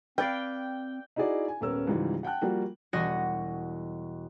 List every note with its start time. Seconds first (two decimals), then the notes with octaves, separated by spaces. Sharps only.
0.18 C4 B4 D5 F5 G5
1.16 D#4 E4 F#4 G#4 D5
1.48 G#5
1.61 D#1 B3 C#4 A#4 E6
1.87 C#2 G#2 E3 F3 G3
2.23 F#5 G5 A5 F#6
2.41 F3 G3 A#3 F#4
2.93 E1 G3 F#4 D#5 A#6 D#7